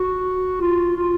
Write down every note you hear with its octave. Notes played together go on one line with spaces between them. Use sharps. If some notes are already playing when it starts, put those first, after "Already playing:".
Already playing: F#4
F4
F4